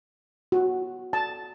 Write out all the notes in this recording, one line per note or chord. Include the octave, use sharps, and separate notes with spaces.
F#4
A5